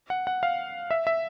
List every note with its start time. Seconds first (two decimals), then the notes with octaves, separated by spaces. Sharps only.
0.10 F#5
0.27 F#5
0.43 F5
0.91 E5
1.07 E5